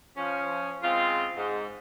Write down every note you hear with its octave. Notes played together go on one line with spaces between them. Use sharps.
F3 C#4
C#3 G#3 C4 F4
G#2